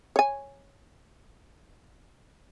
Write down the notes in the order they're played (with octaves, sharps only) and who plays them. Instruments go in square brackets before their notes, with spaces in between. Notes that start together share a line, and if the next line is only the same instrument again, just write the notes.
[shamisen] C#5 G#5